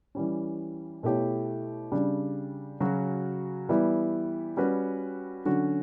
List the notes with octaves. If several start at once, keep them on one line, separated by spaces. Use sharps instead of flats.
E3 G3 C#4
B2 A3 E4 G4 C#5
C#3 G3 D4
C#3 F#3 C#4 F#4
E3 G3 B3 E4
G3 C#4 F#4 B4
D3 F#3 C#4 F#4